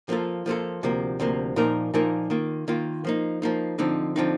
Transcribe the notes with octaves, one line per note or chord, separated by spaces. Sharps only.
F3 A#3 F4 A4
F3 A#3 F4 A4
D2 C3 F3 A#3
D2 C3 F3 A#3
A#2 F3 A#3 D#4 A#4
A#2 F3 A#3 D#4 A#4
D#3 A#3 F4
D#3 A#3 F4
F3 A#3 D#4
F3 A#3 D#4
D3 F3 C4 D#4
D3 F3 C4 D#4